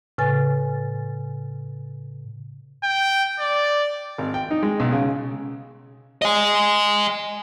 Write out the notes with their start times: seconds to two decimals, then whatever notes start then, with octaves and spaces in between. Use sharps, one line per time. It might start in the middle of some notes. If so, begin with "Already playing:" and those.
0.18 A2 C#3 B4 G#5 A6
2.84 G5
3.40 D5
4.18 G#1
4.34 G5
4.51 D#4
4.63 G#3
4.80 B1
4.92 C#3
6.22 D#5 G#5